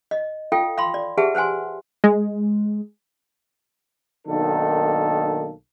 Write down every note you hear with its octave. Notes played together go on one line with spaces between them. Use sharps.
D#5
F4 A4 F5 G5
F5 B5 C6
D5
G4 G#4 B4 E5 F#5 A5
B4 C5 F#5 G#5 C6
G#3
B1 D#3 A#3 D4 A4